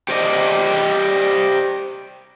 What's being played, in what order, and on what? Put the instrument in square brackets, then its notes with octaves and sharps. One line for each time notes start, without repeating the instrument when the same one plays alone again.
[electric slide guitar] G4 C5 D5 D#5